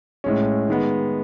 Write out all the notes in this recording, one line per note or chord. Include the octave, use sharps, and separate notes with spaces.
A2 G#3 C#4
D#3 G#3 B3